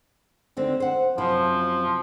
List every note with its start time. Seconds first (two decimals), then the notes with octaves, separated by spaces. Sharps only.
0.57 D#2 D3 C4
0.80 C5 F#5
1.18 F#2 C3 F3 E4